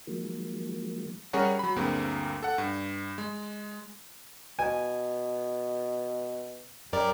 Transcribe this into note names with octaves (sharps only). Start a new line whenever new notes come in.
D#3 F3 F#3 G#3 A#3
G3 C#4 G#4 A#4 C#5 F#5
F#3 B5
D2 G2 A#3 C4 G#4
A4 F#5
G2
G#3
B2 G#5
F#2 G3 A#4 D5